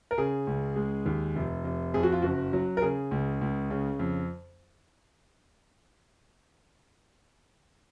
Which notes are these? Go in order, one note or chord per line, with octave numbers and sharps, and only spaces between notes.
A#4
C#3 G#4
C#2
G#3
D#2
F1
F1
F2 G#4
F#4
F4
F#1 F#4
F#3
A#4
C#3 G#4
C#2
C#2
C#3
F2